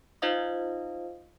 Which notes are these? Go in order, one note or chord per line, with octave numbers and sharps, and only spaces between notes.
D#4 F4 C5 D#5 F5 D#6